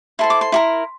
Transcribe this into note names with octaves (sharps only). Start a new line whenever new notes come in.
E4 A4 C5 C6
D6
C6
E4 G4 A#4